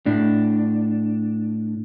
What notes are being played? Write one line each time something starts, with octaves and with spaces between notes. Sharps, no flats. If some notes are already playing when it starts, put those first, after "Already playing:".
A2 D4